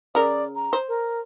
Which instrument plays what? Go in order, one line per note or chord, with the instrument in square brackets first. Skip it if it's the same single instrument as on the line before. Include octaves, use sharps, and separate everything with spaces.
[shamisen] C#3 A#4 [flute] D5
[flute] A#5
[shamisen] C5
[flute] A#4